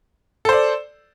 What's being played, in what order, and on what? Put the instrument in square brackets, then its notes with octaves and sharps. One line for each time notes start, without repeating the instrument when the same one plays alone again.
[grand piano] A4
C5
D5